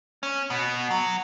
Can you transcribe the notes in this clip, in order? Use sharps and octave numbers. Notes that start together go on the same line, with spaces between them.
C#4
B2
F#3